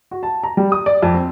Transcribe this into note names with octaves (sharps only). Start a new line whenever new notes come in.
F#4
A5
A#5
G3
D#6
D5
F2
C4